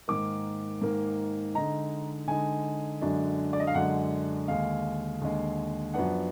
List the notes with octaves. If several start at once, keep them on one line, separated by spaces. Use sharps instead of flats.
G#2 D#3 A#3 D6
G#2 D#3 A#3
D3 G#3 D#4 A#5
D3 G#3 D#4 G#5
F#2 D3 G#3 D4
D5
D#5
F5
F#2 D3 G#3 D4 F#5
D#2 D3 G#3 F5
D#2 D3 G#3
F#2 F3 B3 D4 F#5